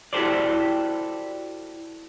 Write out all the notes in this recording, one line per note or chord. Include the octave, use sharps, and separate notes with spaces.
E4 F#4 G4 A4 C5 D5